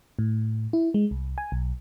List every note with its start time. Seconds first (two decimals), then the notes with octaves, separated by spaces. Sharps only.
0.19 A2
0.73 E4
0.94 G#3
1.11 C2
1.38 G#5
1.52 B1